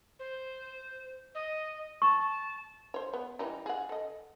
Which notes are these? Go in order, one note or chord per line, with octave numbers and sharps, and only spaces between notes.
C5
D#5
A5 C#6
C5 C#5
B3
E3 G3 D#4
G#4 F#5
A4 D#5